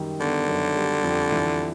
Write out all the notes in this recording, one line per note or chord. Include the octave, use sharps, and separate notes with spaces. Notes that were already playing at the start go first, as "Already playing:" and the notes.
Already playing: F#2 D#3 G3
D3 B3
F#2
G3
F2
E3